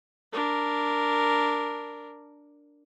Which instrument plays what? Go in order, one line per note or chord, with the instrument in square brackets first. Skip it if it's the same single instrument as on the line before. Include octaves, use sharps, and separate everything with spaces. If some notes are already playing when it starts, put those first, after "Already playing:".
[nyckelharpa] D4 A#4